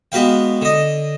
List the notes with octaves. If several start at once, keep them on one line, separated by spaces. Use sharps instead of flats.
G#3 B3 F#4 B4 F5 G5
D3 D#5